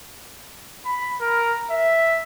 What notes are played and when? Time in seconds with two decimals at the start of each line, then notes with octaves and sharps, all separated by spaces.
0.85 B5
1.21 A#4
1.71 E5